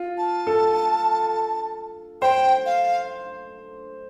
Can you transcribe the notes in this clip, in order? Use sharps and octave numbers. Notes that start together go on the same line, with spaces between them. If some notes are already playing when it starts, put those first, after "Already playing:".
Already playing: F4
A5
A4
C5 G5
F5